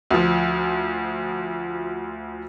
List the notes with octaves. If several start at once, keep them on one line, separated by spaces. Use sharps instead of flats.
D2 F3